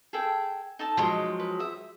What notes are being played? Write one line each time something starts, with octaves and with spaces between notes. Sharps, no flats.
G#4 A4 G5
D#4 A4 A5
F3 F#3 G#3
B4
E5 D#6